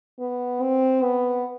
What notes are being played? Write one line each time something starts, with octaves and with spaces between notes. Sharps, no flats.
B3
C4
B3